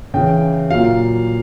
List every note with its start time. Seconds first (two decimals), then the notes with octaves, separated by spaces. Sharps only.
0.14 C#3 E3 G5
0.71 A#2 F#3 F5